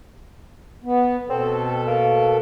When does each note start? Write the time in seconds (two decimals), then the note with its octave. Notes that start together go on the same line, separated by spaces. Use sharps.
0.84 B3
1.30 B2 C4 A4
1.87 A#3